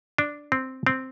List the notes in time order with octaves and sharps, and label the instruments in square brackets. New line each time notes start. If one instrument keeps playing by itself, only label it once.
[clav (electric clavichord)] D4
C4
C4